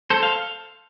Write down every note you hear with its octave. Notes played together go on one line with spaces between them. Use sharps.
A4 C5
F5